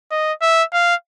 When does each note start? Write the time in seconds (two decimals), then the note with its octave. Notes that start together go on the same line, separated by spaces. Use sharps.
0.11 D#5
0.42 E5
0.73 F5